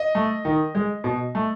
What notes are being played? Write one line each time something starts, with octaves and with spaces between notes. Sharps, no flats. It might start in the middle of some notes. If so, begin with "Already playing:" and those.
Already playing: D#5
A3
D#3
G#3
B2
A3